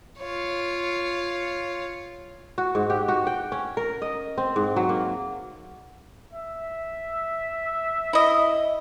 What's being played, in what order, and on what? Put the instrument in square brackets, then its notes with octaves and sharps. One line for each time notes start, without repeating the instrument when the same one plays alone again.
[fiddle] F4 C#5
[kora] F#4
G#2
G4
F#4
G5
C#4
A#4
D#5
C4
G#2
F#3
A#3
[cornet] E5
[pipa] E4 D#5